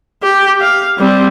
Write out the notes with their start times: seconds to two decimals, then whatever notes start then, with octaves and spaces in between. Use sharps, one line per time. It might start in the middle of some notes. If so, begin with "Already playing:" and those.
0.23 G4
0.60 F5
0.98 G3 C4